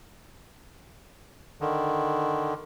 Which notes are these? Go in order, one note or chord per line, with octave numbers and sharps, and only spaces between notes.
D3 D#3